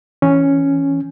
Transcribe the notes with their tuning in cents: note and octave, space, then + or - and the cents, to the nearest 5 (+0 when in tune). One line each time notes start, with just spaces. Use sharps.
E3 +0 C#4 +0